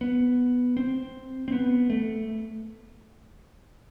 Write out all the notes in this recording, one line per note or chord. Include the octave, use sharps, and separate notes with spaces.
B3
C4
C4
B3
A3